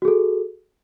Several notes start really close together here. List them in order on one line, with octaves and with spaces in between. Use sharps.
F#4 G#4 A4